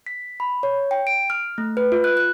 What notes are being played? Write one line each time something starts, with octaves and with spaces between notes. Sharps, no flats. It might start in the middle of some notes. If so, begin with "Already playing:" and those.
B6
B5
C#5
G5
D7
F6
A3
B4
F4
F#6
F#6